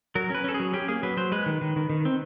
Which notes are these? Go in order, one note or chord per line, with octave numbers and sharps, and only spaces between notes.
F#3 A#4
C#4 B4
C#4 A4
G#4
F#3
C#4 G4
A#3 G#4
F#3 B4
F#3 C5
G#3 B4
D#3
D#3
D#3
D#3
C4